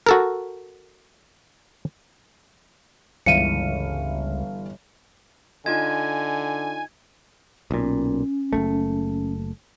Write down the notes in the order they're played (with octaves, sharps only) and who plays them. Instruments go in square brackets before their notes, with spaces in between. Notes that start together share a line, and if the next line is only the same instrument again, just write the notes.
[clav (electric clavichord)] F#4 A4 A#4
[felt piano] G1 E3 F5 [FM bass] C#2 [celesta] C#7 D#7
[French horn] D3 [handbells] D#4 F4 D#5 [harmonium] G#5 [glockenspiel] G#6
[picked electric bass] B1 A#2 [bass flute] C#4
[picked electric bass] F#1 F2 A3